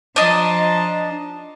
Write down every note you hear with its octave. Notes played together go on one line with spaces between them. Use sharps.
F3 D4 D#5 A5 A#5